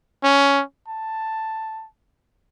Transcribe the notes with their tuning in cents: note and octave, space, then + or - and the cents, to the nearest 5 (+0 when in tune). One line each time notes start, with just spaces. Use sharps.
C#4 +10
A5 +5